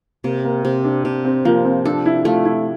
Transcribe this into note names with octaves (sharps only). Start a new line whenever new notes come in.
C3 A#3
A#3
C3 C4
D4
C3 D4
C4
F3 A#3
C4
D4 A4
E4
A3 F4
E4